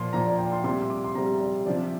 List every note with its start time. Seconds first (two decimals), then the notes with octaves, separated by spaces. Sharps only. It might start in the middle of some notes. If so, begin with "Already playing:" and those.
Already playing: A#2 F3 C6
0.13 A#2 F3 A#5
0.26 D5
0.38 G5
0.52 C6
0.64 C3 G3 C6
0.90 D6
1.04 C6
1.15 C3 G3 A#5
1.40 D5
1.66 C3 F3 D5